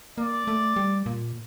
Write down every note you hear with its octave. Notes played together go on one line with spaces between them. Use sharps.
A#3 D5
A3
G3
A#2